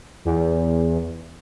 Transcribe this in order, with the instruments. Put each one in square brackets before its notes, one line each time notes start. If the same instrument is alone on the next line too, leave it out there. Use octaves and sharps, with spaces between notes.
[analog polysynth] E2